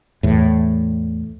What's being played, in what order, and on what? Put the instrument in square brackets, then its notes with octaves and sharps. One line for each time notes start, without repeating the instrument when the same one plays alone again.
[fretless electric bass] E2 A2